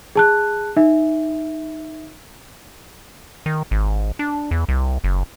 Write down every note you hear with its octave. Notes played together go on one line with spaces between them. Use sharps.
G#4 A5 F#6
D#4 E5
D#3
G#1
D4
E2
C2
F#1